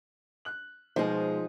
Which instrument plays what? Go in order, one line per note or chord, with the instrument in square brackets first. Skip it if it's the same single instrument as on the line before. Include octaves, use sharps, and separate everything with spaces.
[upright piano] F#6 F#7
[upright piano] B2 G#3 C5 [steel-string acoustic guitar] F3 D#4 G#4